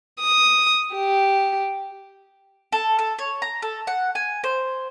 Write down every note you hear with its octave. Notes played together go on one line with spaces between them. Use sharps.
D#6
G4
A4
A4
C#5
A#5
A4
F#5
G#5
C5